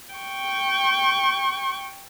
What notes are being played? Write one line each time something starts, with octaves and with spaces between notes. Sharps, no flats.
G5 C#6